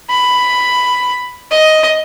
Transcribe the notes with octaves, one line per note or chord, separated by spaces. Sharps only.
B5
D#5